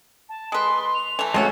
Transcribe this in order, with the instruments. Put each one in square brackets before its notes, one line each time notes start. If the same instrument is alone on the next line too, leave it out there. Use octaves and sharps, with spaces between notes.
[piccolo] A5
[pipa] G#3 B4 [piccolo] C6
[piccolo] F7
[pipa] E3 A3
[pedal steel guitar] G#3 A3 F#4 [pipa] C4 C#4 C#5 [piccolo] E6